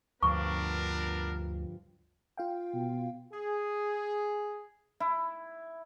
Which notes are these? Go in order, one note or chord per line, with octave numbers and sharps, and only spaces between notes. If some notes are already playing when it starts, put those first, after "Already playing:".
D2 G2 D3 F3 B3 D4 A#4 C#6
F4 F5 G5
B2
G#4
E4